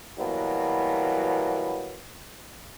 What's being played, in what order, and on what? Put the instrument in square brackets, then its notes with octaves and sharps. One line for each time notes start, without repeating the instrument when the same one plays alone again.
[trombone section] B2 E3 F#3 G3 A#3 B3